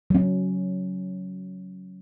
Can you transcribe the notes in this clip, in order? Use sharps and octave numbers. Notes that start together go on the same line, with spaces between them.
F#3 C#4